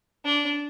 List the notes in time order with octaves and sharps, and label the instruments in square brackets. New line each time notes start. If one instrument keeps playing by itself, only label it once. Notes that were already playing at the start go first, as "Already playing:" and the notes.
[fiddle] D4